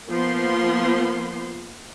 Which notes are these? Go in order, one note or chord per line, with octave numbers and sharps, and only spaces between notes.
F3 A#3 B3 C6